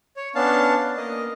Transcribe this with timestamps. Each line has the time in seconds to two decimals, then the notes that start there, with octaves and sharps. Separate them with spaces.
0.17 C#5
0.35 B3 C#4 D4 F5 A5
0.97 A#3 D#5